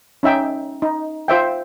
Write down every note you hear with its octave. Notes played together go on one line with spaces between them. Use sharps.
C#4 D#4 E5 G5
D#4
F4 C5 E5 G5